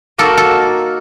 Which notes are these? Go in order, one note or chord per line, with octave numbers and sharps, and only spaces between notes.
A#3 D#4 F#4 A4 A#4
A4